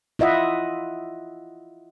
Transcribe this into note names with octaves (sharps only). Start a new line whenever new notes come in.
E4 F4 D#5 E5 F#5